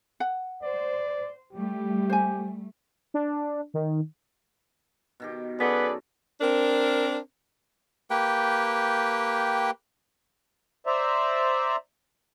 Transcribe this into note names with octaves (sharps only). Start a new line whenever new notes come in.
F#5
C5 D5
G3 A3 G4
C5 G#5
D4
D#3
B2 D#3 G4
F#2 B3 G#4 A4 B4 D5
C4 D4 A#4
A#3 G4 B4 G5
C5 D5 E5 A#5